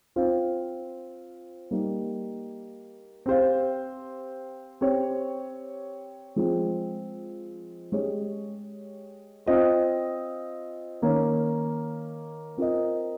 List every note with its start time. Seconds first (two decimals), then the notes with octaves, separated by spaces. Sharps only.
0.16 C4 F4 C5 F5
1.71 G3 A#3 D#4
3.26 C4 G4 C5 F5
4.81 C4 G4 C#5
6.36 F3 G#3 C4
7.92 G#3 C#4 G4 C#5
9.46 C4 F4 C5 D#5
11.02 D#3 A#3 C#4
12.58 C4 F4 A#4 D#5